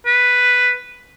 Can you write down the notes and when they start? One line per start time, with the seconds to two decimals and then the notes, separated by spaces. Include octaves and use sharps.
0.06 B4